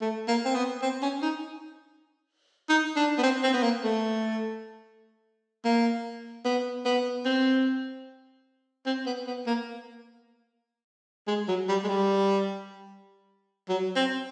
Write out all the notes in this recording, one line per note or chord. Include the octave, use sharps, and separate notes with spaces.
A3
A#3
C4
B3
C4
C#4
D#4
D#4
D4
B3
C4
C4
B3
A#3
A3
A#3
B3
B3
C4
C4
B3
B3
A#3
G#3
F#3
G3
G#3
G3
F#3
C4